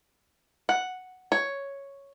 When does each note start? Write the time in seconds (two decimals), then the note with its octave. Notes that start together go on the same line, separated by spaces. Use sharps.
0.69 F#5
1.32 C#5